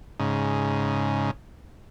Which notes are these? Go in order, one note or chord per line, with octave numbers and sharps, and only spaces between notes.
G#2 C#3